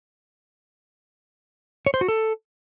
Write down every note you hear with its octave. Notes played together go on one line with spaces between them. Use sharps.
C#5
C5
F#4
A4